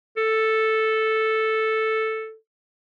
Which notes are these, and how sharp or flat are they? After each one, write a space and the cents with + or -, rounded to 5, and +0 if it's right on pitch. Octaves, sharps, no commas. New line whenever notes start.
A4 +0